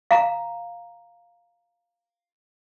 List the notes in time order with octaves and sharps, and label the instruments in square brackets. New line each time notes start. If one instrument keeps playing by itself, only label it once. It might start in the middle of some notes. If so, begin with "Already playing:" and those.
[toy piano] F5 A#5